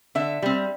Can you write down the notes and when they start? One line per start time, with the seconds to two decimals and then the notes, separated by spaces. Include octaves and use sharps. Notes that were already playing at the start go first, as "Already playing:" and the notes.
0.15 D3 E5
0.42 G3 C4